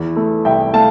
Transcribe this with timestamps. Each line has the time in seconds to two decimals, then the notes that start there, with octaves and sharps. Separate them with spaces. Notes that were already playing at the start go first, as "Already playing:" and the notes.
Already playing: E2 E3
0.16 A3
0.45 C2 E5 G5
0.73 A3 F5 A5